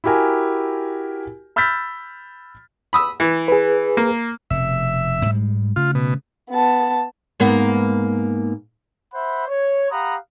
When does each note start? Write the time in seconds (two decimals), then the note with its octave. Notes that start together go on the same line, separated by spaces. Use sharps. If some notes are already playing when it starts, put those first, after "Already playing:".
0.04 E4 F#4 G4 A#4 G#5
1.56 B5 E6 F6 G6 A6 B6
2.93 B5 D#6 E6
3.20 E3
3.48 G#4 B4
3.97 A#3
4.51 F1 B2 E5
5.25 G#2 G3 G#3
5.76 C#3 A3 F4
5.95 B2
6.51 B3 A5
7.40 G#2 A#3 B3
9.13 C5 E5 F#5 B5
9.47 C#5
9.91 G4 F5 F#5 A#5 B5 D#6